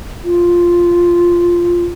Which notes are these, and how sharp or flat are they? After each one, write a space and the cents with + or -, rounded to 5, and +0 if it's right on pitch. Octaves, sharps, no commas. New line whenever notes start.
F4 -5